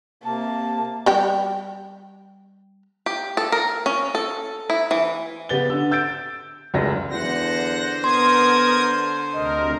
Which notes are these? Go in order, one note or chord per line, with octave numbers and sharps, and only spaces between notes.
C3 A#3 A5
G3 G4 G5
G4
A4
A#4
C#4
A4
E4
E3
C#3 B3 G4 A6 G7
D3 E6
E6 G6 A6 D7
F1 C#2 F#2 C#3 A#6
E2 D3 C5 F#5 A#6
B3 A#4 C6 D#6 G#6
D2 C3 A#4 D#5